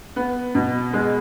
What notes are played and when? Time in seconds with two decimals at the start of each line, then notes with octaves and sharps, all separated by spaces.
0.16 B3
0.55 B2
0.93 G#3